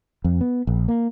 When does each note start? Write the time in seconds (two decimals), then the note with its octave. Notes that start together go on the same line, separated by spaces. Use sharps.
0.24 F2
0.41 B3
0.67 A#1
0.88 A#3